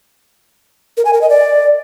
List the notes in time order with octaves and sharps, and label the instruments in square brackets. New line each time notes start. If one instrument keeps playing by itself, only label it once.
[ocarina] A#4
G#5
A#4
D#5
D5